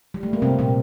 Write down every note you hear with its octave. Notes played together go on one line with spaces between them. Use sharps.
G3
A3
A#3
C3 C4
A#2 A#3